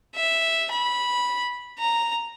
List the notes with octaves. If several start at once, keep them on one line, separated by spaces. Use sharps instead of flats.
E5
B5
A#5